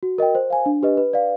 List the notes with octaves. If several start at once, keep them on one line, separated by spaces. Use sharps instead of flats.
F#4
A#4 D#5 G5
C5
F5 G#5
D4
G4 B4 D#5
B4
D5 F5